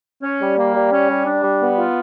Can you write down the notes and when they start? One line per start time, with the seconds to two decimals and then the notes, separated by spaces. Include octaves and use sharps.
0.22 C#4
0.40 G3
0.58 A#3
0.74 G3
0.91 C#4
1.08 G3
1.26 D4
1.43 G3
1.61 B3
1.78 F4